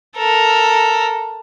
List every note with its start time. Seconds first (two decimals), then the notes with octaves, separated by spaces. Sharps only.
0.16 A4 A#4